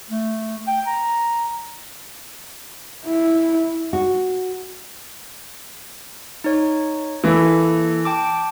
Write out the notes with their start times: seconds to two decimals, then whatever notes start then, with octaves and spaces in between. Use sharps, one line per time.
0.10 A3
0.67 G5
0.87 A#5
3.06 E4
3.93 F#4
6.44 D#4 C#5
7.24 E3 A#3 A4
8.05 G5 A5 D6